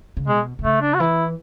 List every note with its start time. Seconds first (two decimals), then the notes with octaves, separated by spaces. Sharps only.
0.17 C#3
0.27 B2 G#3
0.59 B2
0.64 C#3 A3
0.82 D4
0.94 F#4
1.00 E3 E4